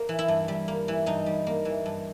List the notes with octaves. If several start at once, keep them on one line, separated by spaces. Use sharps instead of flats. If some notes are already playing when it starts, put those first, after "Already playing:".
Already playing: A#3
E3
E4
G2
G3
A#3
E3
G2 D#4
G3
A#3
E3
G2